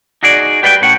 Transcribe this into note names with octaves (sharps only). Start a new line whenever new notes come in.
D#4 F#4 G#4 D5
G4 B4 D5 F#5 G5
A2 C#4 F#5